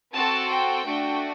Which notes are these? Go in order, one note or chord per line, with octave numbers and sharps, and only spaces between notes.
C4 F#4 A4 A5
G5
A3 D4 F#4